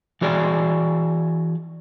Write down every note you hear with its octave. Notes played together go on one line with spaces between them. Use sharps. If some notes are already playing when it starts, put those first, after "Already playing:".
E3 F#4 G#4 D5